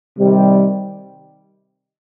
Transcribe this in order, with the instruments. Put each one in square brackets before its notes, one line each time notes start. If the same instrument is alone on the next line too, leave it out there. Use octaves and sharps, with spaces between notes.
[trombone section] C3 D#3 G3